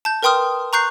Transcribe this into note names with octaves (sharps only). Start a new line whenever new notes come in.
A5 G6
A#4 B4 G5 C6 D#6 F6
A#5 C#6 F#6 G6 C7